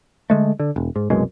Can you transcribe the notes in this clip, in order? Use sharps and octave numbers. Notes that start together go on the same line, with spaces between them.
D3 G#3 A3
D3
E1
G#2
C2 F#2 B2 G#3